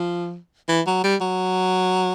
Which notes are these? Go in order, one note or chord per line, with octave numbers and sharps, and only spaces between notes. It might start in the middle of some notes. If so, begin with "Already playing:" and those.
Already playing: F3
E3
F#3
G3
F#3